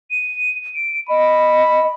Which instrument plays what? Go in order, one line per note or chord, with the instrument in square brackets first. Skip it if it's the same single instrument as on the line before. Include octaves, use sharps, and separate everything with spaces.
[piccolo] D#7
D7
[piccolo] D#5 [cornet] B5